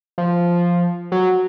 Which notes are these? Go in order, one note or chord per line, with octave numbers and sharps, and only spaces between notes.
F3
F#3